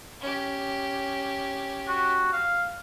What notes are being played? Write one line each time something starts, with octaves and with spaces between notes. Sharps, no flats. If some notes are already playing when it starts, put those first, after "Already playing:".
C#4 G4
F#4
F5